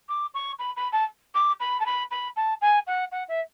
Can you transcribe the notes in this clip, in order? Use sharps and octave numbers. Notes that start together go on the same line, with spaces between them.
D6
C#6
B5
B5
A5
D6
B5
A5
B5
B5
A5
G#5
F#5
F#5
E5